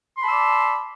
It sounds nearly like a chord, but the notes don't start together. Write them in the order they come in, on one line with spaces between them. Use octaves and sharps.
C6 B5 A5 E6 D5